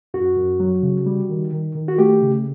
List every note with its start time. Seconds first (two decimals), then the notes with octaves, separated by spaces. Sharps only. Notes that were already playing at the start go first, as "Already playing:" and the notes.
0.14 F#2 F#4
0.37 F#2
0.60 F#3
0.83 C#3
1.06 G3
1.30 D#3
1.53 D#3
1.75 D#3
1.88 F#4
1.98 A3 G4
2.21 C#3